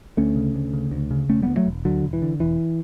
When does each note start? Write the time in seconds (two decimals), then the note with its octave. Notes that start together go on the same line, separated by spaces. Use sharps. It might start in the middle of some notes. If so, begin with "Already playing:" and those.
0.17 D2 A3 C#4
0.36 C#3
0.54 D2
0.73 C#3
0.91 D2
1.11 C#3
1.30 E1 A3 C#4
1.42 G3 B3
1.48 D2
1.57 F#3 A3
1.66 E1
1.85 D2 D3 F#3
2.04 E1
2.13 E3
2.22 D3
2.40 E1 E3